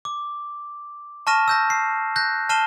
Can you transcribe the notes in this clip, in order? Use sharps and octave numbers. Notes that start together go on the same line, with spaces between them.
D6
A5 C#6 F6 A#6 D#7 E7
E6 G6 A#6
C7
F#6 G6 A#6
A5 F6 C7 D#7 E7 G7